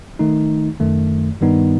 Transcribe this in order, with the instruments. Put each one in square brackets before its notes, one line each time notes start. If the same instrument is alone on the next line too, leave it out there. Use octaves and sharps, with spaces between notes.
[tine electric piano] D#3 A3 D#4
F#2 D#3 A3
G2 D#3 G3 B3 D#4